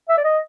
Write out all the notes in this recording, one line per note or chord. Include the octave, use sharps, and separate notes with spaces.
E5
D5
D#5